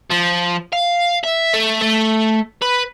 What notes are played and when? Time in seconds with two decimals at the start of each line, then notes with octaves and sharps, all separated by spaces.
0.10 F3
0.73 F5
1.24 E5
1.54 A3
1.82 A3
2.62 B4